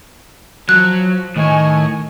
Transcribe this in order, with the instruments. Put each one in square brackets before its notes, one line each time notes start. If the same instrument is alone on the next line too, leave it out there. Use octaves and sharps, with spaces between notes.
[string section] F3 [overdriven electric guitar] F#3 [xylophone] F#6
[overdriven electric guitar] A2 [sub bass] D#3 [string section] D#5 G#5 C#6